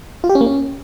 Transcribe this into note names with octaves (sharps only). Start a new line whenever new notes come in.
F4
G4
C#4
A#3
C#4